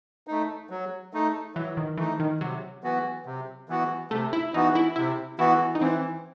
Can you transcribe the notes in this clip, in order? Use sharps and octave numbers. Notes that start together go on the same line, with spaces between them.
A3 D#4
F#3
A3 D#4
E3 F#3
D#3
E3 A3 D#4
D#3
C3 F#3
E3 B3 F#4
C3
E3 B3 F#4
C3 A3
E4
E3 B3 D#4 F#4
E4
C3 E4
E3 B3 E4 F#4
D#4
E3 C4